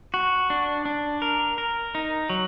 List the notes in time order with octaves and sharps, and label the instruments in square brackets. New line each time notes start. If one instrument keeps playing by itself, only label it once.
[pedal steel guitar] F#4
D4
D4
A#4
A#4
D#4
F#3